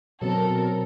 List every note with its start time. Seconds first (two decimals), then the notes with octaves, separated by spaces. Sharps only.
0.22 B2 F#3 C4 A4 A#4